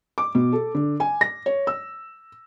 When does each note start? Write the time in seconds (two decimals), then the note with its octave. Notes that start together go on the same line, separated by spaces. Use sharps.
0.18 D6
0.35 B2
0.52 A4
0.75 D3
1.00 G#5
1.21 A#6
1.46 C#5
1.67 E6